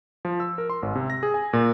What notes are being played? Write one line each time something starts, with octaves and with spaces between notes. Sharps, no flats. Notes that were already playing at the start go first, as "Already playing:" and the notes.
F3
E6
A#4
C6
G#1
C3
A#6
G#4
G#5
A#2